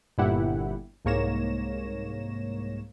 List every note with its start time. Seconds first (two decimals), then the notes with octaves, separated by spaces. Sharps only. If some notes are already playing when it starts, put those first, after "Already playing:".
0.18 G1 A#2 E4 G4 F#5
1.05 C2 G#2 A#3 C#5 A#6 E7